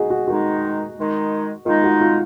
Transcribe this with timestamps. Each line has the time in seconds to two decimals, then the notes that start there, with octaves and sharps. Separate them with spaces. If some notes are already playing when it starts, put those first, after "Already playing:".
Already playing: D#4 F#4 G#4
0.10 F#4
0.28 D#3 G#3 D#4 F#4
0.97 D#3 G#3 D#4
1.66 D#3 G#3 D#4 F4
1.84 F#4
2.01 F4